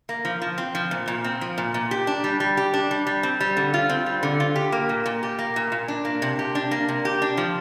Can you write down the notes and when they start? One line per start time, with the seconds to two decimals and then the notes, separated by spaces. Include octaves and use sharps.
0.09 A#3
0.25 F3
0.42 F3
0.58 C4
0.75 F3
0.91 A#2
1.08 A#2
1.24 C4
1.41 F3
1.58 A#2
1.74 A#2
1.91 G4
2.07 D4
2.24 G3
2.40 G3
2.57 G4
2.74 D4
2.91 G3
3.07 G3
3.23 C4
3.40 G3
3.57 D3
3.74 F4
3.90 C4
4.06 G3
4.23 D3
4.40 F4
4.56 G4
4.72 A#3
4.89 A#2
5.06 A#2
5.23 G4
5.39 A#3
5.56 A#2
5.72 A#2
5.88 D4
6.05 A#3
6.22 C3
6.39 G4
6.55 D4
6.71 A#3
6.88 C3
7.05 G4
7.22 D4
7.37 F3